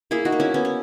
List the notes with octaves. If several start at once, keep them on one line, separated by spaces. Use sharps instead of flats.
A#3 E4 G#4
D#4 F#4
A#3
C#4 E4
B3 C#4
C#4